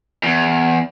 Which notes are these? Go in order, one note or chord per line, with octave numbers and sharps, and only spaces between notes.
E2